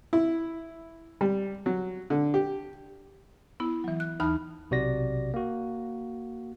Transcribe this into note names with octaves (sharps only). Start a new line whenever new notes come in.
E4
G3
F#3
D3
G4
B3 E4
E3 F#3
F#6
D#2 E3 D#4 A5 B5 F6
B1 C3 F#4 D5 A#6
A#3 F#4